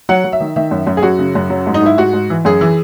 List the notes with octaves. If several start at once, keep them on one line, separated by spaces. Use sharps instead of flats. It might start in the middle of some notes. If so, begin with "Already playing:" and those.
F#3 F#5
F#3
E5
D#3
D#3 E5
F#2
F#2
G#4
F#2 F#4
C#3
F#2
F#3
G#2
D#4
G#2 E4
G#2 F#4
G#2
E3
F#2 G#4
E3